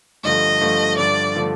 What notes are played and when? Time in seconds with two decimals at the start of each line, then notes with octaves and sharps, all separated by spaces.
0.23 G2 D3 F3 A3 D#5
0.60 G2 D3 F3 A3
0.97 G2 D3 F3 A3 D5
1.35 D3 F3 A3